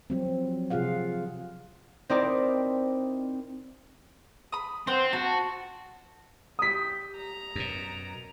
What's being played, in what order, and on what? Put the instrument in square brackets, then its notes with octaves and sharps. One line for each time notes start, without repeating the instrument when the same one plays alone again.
[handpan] F3 F#3 C4
C3 F3 F4 G#4 F5 F#5
[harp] C4 D#4 E4 A#4 D5
[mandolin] B5 D#6
[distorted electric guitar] C4 [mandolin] C5 F#5
[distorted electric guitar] F#4 [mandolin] A5
[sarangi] G4 [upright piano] D#6 B6
[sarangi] A#5
[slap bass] F#2 B2